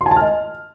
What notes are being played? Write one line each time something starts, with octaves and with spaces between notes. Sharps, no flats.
C6
G#5
A5
F6
D#5